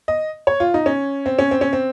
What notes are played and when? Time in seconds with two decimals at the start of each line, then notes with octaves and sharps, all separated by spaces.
0.08 D#5
0.47 C#5
0.60 F4
0.74 D#4
0.86 C#4
1.26 C4
1.39 C#4
1.51 C4
1.61 C#4
1.73 C4